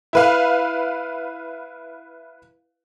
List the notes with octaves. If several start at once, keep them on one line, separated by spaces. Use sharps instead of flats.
E4 B4 F5